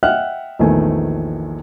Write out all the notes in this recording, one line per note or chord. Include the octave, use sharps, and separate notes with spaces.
D#5 E5 F#5 G5 F6 F#6
A#1 E2 D#3 A3 G#5